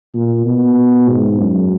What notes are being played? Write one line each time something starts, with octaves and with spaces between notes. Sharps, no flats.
A#2
B2
G#2
F#2